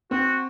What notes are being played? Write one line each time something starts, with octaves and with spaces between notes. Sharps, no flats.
C4 F#4